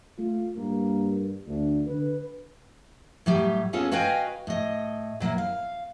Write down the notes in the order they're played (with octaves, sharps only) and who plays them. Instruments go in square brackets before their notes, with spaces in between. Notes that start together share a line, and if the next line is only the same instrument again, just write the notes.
[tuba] A3 [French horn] F4
[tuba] G2 [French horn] A#3
[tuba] D2 [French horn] D4
[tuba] D3 [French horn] B4
[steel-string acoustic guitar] A2 F#3 G3 G4
A#3 B3 C#4 F4 G#4 A4
F#4 B4 D#5 F5 G5 G#5
A2 D#5
A#2 F#3 A#3 E4
F5